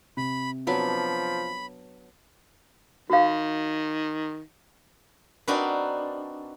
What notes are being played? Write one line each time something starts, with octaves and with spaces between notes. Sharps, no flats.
C3 B5
F3 F#3 B3 D4 B5
D#3 F#4 F5
C4 D4 D#4 F#4 A#4 B4